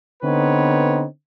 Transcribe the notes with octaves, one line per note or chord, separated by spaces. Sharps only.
D3 B3 C4 D#4 B4 C#5